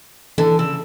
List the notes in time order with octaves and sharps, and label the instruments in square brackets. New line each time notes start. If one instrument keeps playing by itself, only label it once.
[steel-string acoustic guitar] D3 [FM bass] E3 [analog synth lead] A4
[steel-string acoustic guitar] C#3 [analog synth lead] E6